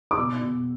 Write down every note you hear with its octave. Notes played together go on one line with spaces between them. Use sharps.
D6
B2 E6
B2